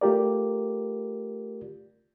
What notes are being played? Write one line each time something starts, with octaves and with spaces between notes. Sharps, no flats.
A3 F4 G4 A#4 D5